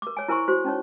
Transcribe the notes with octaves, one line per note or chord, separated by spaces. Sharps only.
A#4 D6
C#5 G#5
E4 A#4 C5 G#5 C6 C#6
F#4 C5
C#4 D#4 C#5